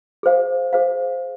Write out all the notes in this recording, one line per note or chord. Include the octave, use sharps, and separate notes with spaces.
G#4 C5 F5
G#4 C5 F5